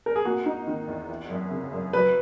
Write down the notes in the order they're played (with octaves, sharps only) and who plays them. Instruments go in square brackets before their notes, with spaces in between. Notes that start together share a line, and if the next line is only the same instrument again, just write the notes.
[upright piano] A#4
G#4
[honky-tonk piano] A#3 [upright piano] F#4
[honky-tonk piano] D#4
D#3
E2
E3
F#2
C#3
F#2
[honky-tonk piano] F#3 [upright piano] B4